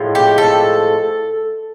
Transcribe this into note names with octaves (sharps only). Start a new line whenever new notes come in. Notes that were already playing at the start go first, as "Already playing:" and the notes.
Already playing: A2 F3 G#3
G4
A4